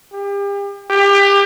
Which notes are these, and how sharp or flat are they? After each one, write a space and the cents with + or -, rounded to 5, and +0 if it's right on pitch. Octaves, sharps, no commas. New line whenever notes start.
G4 +40
G4 +30